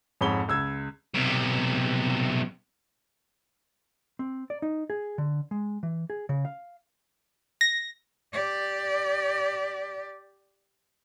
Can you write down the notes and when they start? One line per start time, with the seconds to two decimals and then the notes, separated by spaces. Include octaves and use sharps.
0.21 F2 G#2 C#5 B5 G7
0.48 C#2 E6 G#6
1.14 B1 C3
4.19 C4
4.50 D5
4.62 D#4
4.90 G#4
5.18 D3
5.51 G#3
5.83 E3
6.10 G#4
6.29 C#3
6.45 F5
7.61 A#6
8.33 G4 D5